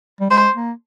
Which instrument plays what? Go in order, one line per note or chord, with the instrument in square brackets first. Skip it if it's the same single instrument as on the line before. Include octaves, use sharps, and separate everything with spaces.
[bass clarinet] G3
[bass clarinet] G#3 [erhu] C5
[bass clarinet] A#3